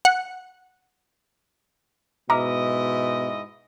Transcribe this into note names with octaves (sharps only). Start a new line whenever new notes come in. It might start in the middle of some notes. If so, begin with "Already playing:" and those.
F#5
G#2 B2 E4 D#5 A#5 D6 F6